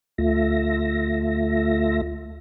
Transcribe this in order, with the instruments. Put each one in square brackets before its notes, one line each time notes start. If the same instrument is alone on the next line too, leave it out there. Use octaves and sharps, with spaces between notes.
[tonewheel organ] D2 A3 F4 E5 A#6